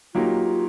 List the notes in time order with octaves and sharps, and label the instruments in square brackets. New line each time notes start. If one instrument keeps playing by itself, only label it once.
[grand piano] F#3 A#3 D#4 G4 [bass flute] F4